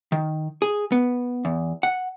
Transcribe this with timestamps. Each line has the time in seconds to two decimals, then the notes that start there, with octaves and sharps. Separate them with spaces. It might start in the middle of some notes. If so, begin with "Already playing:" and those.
0.12 D#3
0.62 G#4
0.92 B3
1.45 E2
1.83 F#5